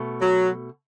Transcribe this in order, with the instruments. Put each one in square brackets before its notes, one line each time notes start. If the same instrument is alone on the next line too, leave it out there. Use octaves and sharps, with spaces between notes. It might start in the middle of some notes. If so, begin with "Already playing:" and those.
Already playing: [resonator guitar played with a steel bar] B2 A3
[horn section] F#3